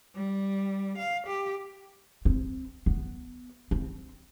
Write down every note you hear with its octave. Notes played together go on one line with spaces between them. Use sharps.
G3
F5
G4
C4
B3
C4